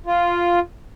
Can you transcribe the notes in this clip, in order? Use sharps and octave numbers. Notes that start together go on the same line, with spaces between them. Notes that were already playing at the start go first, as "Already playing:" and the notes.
F4